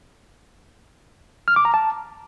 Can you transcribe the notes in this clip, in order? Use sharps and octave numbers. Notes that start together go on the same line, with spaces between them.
F6
D6
A#5
A5